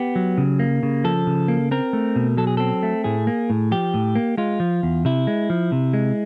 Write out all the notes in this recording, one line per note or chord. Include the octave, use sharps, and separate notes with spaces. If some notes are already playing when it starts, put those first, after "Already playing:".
Already playing: B3 G4
F#3
C#3
A#3
C#3
F3 A4
C#3
A#3
C4 A#4
A3
B2
F#3 A4
G#4
C4 A4
A3
A2 G#4
A#3
A2
F3 G4
A2
A#3
G#3 F4
F3
E2
C3 E4
G#3
F3
C3
G#3